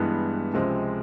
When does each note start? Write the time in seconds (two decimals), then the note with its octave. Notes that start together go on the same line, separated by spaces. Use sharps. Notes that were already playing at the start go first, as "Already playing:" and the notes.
Already playing: G2 E3 G#3 B3
0.54 C#2 C3 F3 G#3 C4